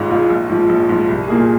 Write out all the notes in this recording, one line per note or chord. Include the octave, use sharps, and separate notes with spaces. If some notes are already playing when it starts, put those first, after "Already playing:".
Already playing: G#1 G#2 G#3 F4
G#2 G#3 F4
A#1
G#2 F3
A#1
G#2 F3
C2
A#2 A#3 G#4